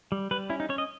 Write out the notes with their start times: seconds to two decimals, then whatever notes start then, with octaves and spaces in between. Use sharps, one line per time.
0.12 G3
0.31 G3 B4
0.50 C#4 E4
0.60 D#4
0.69 C#4 C#5
0.78 D#5